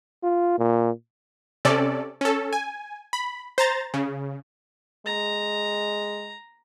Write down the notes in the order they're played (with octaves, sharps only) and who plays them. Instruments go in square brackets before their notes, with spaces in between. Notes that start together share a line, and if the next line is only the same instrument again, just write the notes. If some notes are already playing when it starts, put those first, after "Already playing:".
[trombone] F4
A#2
[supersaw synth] C3 C#4 A4 D5
C#4 A4
G#5
B5
C5 A#5 A6
C#3
[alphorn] G#3 [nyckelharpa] A#5